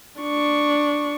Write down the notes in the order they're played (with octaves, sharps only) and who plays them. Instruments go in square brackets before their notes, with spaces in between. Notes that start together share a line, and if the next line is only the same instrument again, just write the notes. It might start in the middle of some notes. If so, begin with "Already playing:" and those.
[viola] D4 C#6